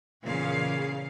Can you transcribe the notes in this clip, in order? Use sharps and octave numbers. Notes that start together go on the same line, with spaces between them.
E2 A#2 C#3 G#4 F5